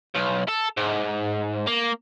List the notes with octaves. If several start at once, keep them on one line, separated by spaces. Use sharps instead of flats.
B1
A4
G#2
A#3